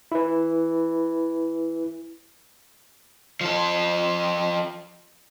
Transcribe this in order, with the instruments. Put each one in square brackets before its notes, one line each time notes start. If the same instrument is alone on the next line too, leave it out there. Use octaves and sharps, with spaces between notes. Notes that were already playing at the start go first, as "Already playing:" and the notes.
[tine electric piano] E4 B4
[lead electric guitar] F3 A4